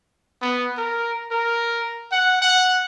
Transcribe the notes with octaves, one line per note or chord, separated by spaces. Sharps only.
B3
A#4
A#4
F#5
F#5